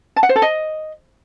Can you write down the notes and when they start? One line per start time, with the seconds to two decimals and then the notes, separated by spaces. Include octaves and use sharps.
0.16 A5
0.23 F#5
0.29 C5
0.36 A4
0.42 D#5